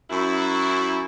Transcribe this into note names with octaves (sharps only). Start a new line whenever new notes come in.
F#2 E4